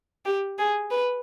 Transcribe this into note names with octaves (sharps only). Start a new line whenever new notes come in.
G4
G#4
B4